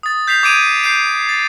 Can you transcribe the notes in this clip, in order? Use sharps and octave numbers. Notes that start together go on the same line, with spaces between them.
D#6 A6
G6 B6 C7 F7
D6 G#6 D7 D#7 F7
G6 C7 D#7
A6